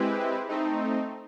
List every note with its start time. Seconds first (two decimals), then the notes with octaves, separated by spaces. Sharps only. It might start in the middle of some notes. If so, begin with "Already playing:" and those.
Already playing: G#3 C4 E4 G4 B4
0.48 A3 C4 D#4